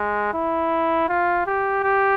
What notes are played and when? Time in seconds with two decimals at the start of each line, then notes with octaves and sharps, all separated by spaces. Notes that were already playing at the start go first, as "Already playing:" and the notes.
Already playing: G#3
0.34 E4
1.08 F4
1.46 G4
1.83 G4